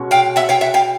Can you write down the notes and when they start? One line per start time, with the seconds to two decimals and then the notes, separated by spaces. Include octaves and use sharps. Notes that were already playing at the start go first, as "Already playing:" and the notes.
Already playing: B2 G#3 C#4
0.11 F5 G5
0.36 E5 F#5
0.49 F5 G5
0.61 E5 F#5
0.74 F5 G5